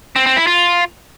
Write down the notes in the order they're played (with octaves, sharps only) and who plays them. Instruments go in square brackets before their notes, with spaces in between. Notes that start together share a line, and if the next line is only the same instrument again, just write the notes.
[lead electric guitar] C4
C4
E4
F4